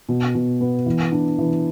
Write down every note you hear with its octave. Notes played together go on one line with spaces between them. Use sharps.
B2
B2
B3
E3
D4
E3